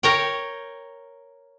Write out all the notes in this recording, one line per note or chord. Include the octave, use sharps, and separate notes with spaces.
A#4 C#5 G5